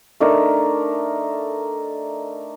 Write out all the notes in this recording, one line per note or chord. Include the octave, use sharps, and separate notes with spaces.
A3 D4 D#4 A#4